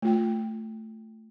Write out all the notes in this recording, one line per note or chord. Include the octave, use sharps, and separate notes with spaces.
A3 F4 G5